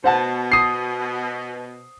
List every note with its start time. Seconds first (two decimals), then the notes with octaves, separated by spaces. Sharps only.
0.04 B2 C5 F#5 A5
0.52 D#6 C7